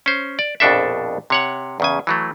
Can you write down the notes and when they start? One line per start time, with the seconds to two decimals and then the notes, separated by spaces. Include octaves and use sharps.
0.06 C#4 C5
0.39 D5
0.60 A#1 F2 B2 D4 A4 E5
1.30 C3 C#5 F#5
1.80 E2 C#3 G#5
2.07 E3 F#3 A3